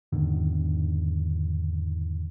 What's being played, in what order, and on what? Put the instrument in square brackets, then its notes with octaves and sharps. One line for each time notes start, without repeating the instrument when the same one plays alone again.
[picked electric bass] E2 G#2 D3 D#3